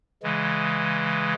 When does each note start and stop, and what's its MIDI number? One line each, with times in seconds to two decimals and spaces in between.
0.23 1.34 49
0.23 1.34 52
0.23 1.34 56